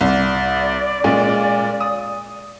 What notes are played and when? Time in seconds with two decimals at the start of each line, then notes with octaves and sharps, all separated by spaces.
0.01 C2 D5
1.04 A#2 G#3 C#4
1.81 D#6